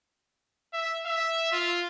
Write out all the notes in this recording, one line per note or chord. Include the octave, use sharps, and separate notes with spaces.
E5
E5
F4